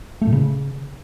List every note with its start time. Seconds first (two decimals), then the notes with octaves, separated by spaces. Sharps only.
0.22 A3
0.27 A2
0.32 C#3